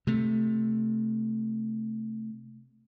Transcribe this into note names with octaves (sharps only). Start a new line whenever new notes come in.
C3 A3